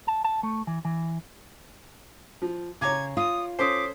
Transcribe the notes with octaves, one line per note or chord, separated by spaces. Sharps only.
A5
A5
A3
E3
E3
F3
C#3 C#5 A#5 D6 G#6
F4 D#6
C#4 A4 C5 D6 D#6 B6 C7